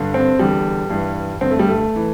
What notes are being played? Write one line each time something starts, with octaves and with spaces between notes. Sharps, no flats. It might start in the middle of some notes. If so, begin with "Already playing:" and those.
Already playing: G2 D3
C4
E2 D3 G3
G2 E3
G2 D3 C4
A3
G3
A3
E3